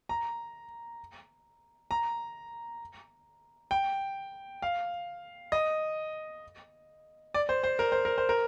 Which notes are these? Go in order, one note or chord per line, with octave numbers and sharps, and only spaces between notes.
A#5
A#5
G5
F5
D#5
D5
C5
C5
A#4
C5
A#4
C5
A#4